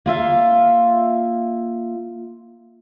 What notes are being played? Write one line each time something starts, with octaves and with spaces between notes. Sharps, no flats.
A#3 F4 E5 F5